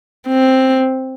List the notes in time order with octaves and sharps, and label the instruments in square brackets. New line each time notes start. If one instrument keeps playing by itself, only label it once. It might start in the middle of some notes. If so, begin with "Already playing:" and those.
[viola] C4